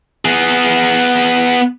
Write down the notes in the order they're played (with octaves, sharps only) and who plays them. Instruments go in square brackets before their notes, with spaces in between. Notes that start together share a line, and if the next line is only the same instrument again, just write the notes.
[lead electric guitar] B3 G#4